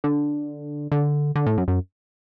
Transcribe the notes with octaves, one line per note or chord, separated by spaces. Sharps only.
D3
D3
D3
A2
F#2
F#2